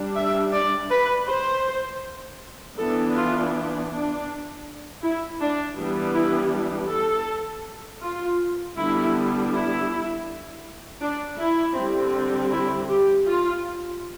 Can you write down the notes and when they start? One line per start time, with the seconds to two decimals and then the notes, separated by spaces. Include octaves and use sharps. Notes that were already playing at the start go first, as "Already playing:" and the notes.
Already playing: G3 D4
0.16 E5
0.53 D5
0.90 B4
1.27 C5
2.78 E3 B3 D4 A4
3.15 F4
3.90 D4
5.02 E4
5.40 D4
5.77 E3 G3 B3 D4
6.14 E4
6.89 A4
8.02 F4
8.76 D3 G3 B3 D4 E4
9.51 E4
11.01 D4
11.39 E4
11.76 D3 G3 C4
12.51 E4
12.88 G4
13.26 F4